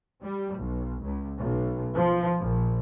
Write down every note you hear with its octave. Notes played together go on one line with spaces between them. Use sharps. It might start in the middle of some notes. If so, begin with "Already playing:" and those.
G3
B1
C#2
B1
F3
A#1